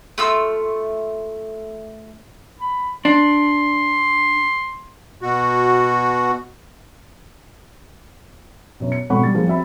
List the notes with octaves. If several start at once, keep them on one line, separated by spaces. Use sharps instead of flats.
A3 F4 E6
B5
D4 C6
B2 F#4
F#2 B2
C#7
G#1 B2 A4 F#5 B5 C#6
G3 A6
F3 G3 A#3 G#4
C4 F#4 E5 B5